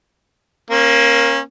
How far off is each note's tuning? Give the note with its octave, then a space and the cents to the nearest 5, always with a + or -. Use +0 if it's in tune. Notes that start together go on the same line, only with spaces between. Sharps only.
A#3 +10 C#4 -30